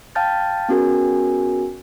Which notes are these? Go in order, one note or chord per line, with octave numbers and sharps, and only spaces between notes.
F5 G5 A5 F6 G6 A6
B3 C#4 F#4 G#4 A#4 G#5